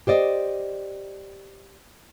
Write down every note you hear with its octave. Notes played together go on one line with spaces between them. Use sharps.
G4 C5 D5 D#5